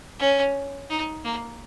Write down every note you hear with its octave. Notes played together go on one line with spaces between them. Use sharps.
C#4
D#4
A#3